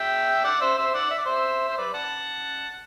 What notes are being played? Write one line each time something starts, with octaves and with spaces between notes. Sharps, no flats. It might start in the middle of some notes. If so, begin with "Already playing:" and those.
Already playing: E5 G5
D5 F#5
C5 E5
C5 E5
D5 F#5
E5
D5
C5 E5
C5
B4 D5
F#5 A5